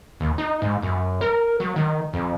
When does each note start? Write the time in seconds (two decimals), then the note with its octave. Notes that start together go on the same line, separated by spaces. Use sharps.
0.20 D#2
0.38 D#4
0.62 G#2
0.82 F#2
1.21 A#4
1.60 F#3
1.76 D#3
2.13 F2